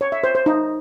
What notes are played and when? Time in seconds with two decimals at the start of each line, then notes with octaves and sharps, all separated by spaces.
0.01 C#5
0.12 E5
0.24 C5
0.35 C5
0.46 D#4